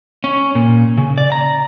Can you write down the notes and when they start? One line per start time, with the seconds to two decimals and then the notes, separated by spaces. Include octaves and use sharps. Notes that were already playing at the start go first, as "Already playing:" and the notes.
0.24 C#4
0.55 A#2
0.98 C#3
1.18 D5
1.32 A#5